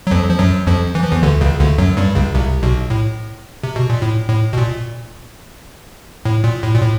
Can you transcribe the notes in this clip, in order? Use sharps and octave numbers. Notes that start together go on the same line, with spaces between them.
F#3
F2 F3
F3
F#2 F#3
F2 F3
E3
F3
E2 E3
D2 D3
C#2 C#3
D2 D3
F#2 F#3
G2 G3
C#2 C#3
C2 C3
B1 B2
A2
C3
B2
A#2
A2
A2
B2
A#2
A2
A#2
A2
A#2
A2